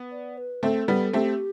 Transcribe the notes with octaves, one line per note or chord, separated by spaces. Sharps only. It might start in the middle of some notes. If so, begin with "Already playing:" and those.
Already playing: B3
D5
B4
A3 C4 A4
G3 B3
A3 C4 G4